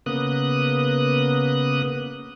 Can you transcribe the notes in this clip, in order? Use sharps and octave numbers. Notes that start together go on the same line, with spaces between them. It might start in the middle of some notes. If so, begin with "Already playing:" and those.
C#3 A#3 B3 D#6 F#6